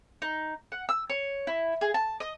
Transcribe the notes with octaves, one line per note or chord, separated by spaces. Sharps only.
D#4
F#5
E6
C#5
E4
G#4
A5
D#5